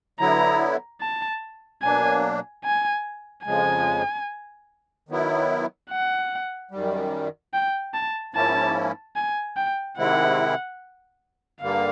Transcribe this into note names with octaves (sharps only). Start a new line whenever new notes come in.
D3 F#3 B3 E4 A#5
A5
B2 F#3 A#3 D4 G#5
G#5
F2 C#3 F3 G#3 G#5
D#3 F#3 B3 E4
F#5
F#2 D#3 G3
G5
A5
G#2 F3 A#3 C#4 E4 A5
G#5
G5
C3 D#3 G#3 C4 E4 F#5
G2 D3 G3 A#3 F5